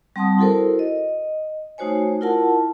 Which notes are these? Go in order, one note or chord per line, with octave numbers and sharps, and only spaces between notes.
G3 C4 F#5 A5 C6 D#6
E4 F#4 A4 A#4 C5
D#5
A3 D#4 F#4 C5 C#5 G#5
E4 F4 A#4 F#5 A5